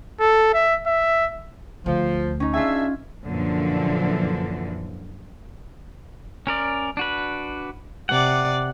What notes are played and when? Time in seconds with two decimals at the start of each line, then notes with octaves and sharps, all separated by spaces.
0.20 A4
0.54 E5
0.87 E5
1.86 D2 F3
2.40 C#4 D#4
2.54 D4 F4 G#4 E5 G#5
3.25 F#2 A#2 D3 E3 F3
6.47 C#4 A#4 D5
6.97 D4 F#4 B4
8.09 C3 D5 F#5